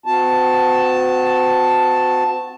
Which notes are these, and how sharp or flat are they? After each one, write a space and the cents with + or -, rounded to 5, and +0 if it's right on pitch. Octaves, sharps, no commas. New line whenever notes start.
C4 -45 F#4 -20 A5 +0